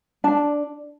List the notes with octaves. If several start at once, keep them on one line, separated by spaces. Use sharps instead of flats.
D4 A5